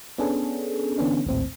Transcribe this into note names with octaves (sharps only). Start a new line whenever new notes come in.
B3 C#4 D4 G#4 A4
D3 E3 B3 C#4 D4
A#1 D#2 A2 C4